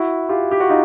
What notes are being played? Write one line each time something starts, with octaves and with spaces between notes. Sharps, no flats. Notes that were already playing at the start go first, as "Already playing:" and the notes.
Already playing: E4 F#4
F4 G4
G4
F#4
D#4 F4